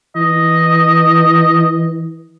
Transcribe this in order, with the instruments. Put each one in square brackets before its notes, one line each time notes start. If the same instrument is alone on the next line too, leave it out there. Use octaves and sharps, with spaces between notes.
[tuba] E3 [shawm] D#5